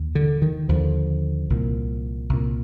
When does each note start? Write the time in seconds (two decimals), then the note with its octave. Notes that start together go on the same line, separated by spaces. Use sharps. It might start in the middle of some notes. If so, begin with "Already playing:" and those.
Already playing: D#2
0.15 D3
0.42 D#3
0.69 D#2 D3 F3
1.50 C2 A#2
2.29 C2 A#2